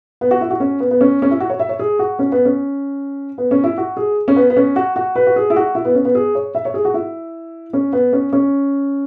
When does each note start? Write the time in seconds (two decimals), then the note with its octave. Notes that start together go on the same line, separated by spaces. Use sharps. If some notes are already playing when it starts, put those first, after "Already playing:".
0.21 B3
0.31 F#4
0.41 E4
0.50 F#4
0.60 C#4
0.80 B3
0.91 B3
1.01 C#4
1.22 C#4
1.31 E4
1.40 F#4
1.50 C#5
1.60 E5
1.69 C#5
1.79 G#4
1.99 F#4
2.19 C#4
2.32 B3
2.45 C#4
3.38 B3
3.51 C#4
3.64 E4
3.78 F#4
3.97 G#4
4.28 C#4
4.36 B3
4.50 B3
4.56 C#4
4.76 F#4
4.96 F#4
5.16 B4
5.27 F#4
5.36 G#4
5.50 E4
5.56 F#4
5.75 E4
5.85 B3
5.95 C#4
6.05 B3
6.15 G#4
6.35 C#5
6.55 E5
6.65 C#5
6.74 G#4
6.85 F#4
6.94 E4
7.73 C#4
7.93 B3
8.13 C#4
8.33 C#4